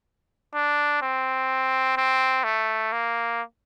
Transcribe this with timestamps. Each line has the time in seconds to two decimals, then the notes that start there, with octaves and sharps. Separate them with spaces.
0.55 D4
1.02 C4
1.97 C4
2.44 A3
2.92 A#3